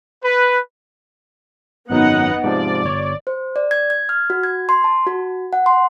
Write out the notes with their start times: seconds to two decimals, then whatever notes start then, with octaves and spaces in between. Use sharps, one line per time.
0.24 B4
1.90 G#1 F#2 F#3 B3 D#4 F#5
2.44 G#2 C3 F3 D5
2.84 G1 C#5
3.27 C5
3.56 D5
3.71 G#6
3.90 G#6
4.09 F6
4.30 F#4
4.43 G#6
4.69 C6
4.84 A5
5.07 F#4
5.53 F#5
5.66 C6